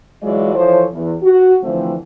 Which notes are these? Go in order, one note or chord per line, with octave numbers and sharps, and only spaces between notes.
E3 F#3 G#3 F4 C#5 D5
E3 F3 A4 C5 C#5
E2
F#4
D3 E3 F3 A3 C4